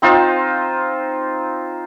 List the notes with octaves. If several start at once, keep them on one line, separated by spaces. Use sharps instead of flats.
C4 D#4 F4 C5